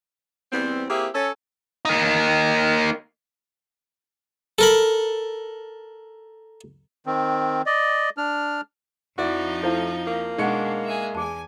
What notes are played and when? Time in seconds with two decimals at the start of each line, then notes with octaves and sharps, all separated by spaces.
0.52 E2 G3 B3 C4
0.89 A#3 C4 E4 G4 G#4
1.14 C#4 A4
1.85 A#3 D#4
4.59 A4 A#4 B5
7.06 D#3 C4
7.66 D5 D#5
8.17 D4 F6
9.18 F2 F3 D#4 E4 F#4 D5 E5
9.63 A3 E4 F4 C5 A5
10.07 A#3
10.38 B2 G#3 D4 D#4 F#5 C#6 C#7
10.85 G#4 E5
11.15 E2 G#4 G#5 A5